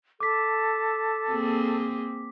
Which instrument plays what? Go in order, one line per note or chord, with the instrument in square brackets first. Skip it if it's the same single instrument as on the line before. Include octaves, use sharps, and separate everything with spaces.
[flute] A4 [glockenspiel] D6 B6
[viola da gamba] A#3 C4 G#4